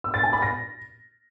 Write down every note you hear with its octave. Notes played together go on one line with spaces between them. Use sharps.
E6
A6
G#5
B5
A#6